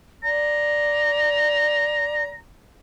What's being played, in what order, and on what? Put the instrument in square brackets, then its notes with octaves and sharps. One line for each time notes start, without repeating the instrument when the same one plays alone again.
[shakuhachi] D5 [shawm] A#5